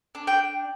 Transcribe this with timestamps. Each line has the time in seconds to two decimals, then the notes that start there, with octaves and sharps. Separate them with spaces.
0.15 D4
0.27 G5